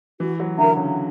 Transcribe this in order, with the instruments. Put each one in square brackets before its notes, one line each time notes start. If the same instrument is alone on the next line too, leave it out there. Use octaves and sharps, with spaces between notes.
[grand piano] E3 [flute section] F#4
[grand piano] F#3
[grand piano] D3 [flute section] A#4 E5 A#5
[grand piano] C#3